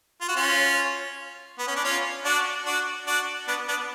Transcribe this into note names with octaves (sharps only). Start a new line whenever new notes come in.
F4
F#4
C#4 F4
B3
C#4
D4
C#4 F4
D4 F#4
D4 F#4
D4 F#4
B3 D4
B3 D4